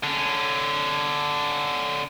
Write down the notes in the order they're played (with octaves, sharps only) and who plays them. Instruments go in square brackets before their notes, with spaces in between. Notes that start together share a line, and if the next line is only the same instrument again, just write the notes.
[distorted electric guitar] D3 C#4